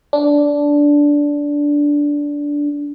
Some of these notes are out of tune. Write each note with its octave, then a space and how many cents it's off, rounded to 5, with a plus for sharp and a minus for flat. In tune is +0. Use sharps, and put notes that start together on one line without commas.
D4 -10